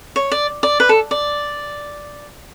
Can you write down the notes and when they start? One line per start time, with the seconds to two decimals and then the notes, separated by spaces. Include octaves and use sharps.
0.16 C#5
0.32 D5
0.63 D5
0.80 B4
0.89 A4
1.11 D5